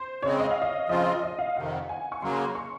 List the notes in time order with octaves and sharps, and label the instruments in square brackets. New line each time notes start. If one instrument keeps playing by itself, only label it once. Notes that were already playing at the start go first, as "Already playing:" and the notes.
Already playing: [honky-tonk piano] C5
[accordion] C#3 G#3 C4 [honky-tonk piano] C#5
[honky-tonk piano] D#5
F5
D#5
[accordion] C#3 F3 C4 F4 [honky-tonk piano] D#5
[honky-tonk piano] D#5
F5
[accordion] F2 C3 D#3 [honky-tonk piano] F#5
[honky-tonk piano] G#5
C#6
[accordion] C#3 F#3 A#3 [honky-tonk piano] C6
[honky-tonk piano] C#6